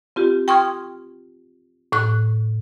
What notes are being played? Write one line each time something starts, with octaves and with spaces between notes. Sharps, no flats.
C4 F4 G4
G5 C6 C#6 D#6 F6 G#6
A2 C#6 F#6